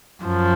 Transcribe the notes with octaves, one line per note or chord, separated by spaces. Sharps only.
F#2 F3